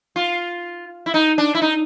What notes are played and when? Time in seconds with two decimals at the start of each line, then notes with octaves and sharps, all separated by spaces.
0.16 F4
1.06 E4
1.14 D#4
1.38 D4
1.55 E4
1.62 D#4